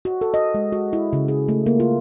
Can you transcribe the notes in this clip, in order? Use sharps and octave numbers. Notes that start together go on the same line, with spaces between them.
F#4
A4
D#5
G#3
F#4
E4
C#3
G#4
A3
A#3
F4